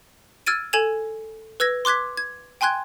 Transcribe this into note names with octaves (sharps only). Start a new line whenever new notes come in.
E6 F6 G#6 A6 D7 D#7
A4 G#5 G#6 E7 F7
B4 E6 G#6 A#6
C6 D6 F#6 G#6 B6
G#6
G5 G#5 C6 F#6 G#6